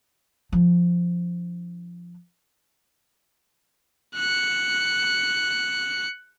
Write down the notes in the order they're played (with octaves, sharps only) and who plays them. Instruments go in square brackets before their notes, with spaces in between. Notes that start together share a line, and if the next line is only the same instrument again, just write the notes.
[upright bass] F3 D4
[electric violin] F#6 C#7